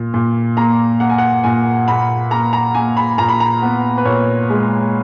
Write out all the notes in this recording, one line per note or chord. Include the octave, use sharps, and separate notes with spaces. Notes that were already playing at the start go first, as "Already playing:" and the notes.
Already playing: A#2
A#2
A#3 A#5
A#3 F#5
G#5
F#5
A#2 G#5
A#2 B5
A#3 A#5
A#5
A#3 G#5
B5
A#2 A#5
B5
A#5
B3
B4
A#2 C#5
G#3